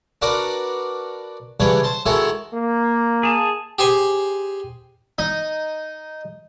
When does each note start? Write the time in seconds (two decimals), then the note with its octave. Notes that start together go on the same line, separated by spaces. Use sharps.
0.22 D4 F#4 A#4 B4 D5
1.60 C#3 E3 G3 D4 B4 C#5
1.84 C5 A5 C6
2.06 D#3 G#3 E4 F#4 A4 C#5
2.53 A#3
3.23 G#4 A5
3.79 G4 G#4 C5 G#5
5.19 D#4